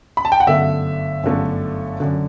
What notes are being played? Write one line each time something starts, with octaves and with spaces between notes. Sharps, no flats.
B5
A5
G5
F#5
G1 F#2 D3 A3 E5
G1 F#2 D3 A3
F#2 D3